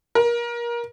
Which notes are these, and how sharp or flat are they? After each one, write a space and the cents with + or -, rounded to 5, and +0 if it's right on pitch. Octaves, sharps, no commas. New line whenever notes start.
A#4 +25